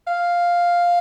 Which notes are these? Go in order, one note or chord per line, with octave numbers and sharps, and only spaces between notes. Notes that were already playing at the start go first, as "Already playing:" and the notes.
F5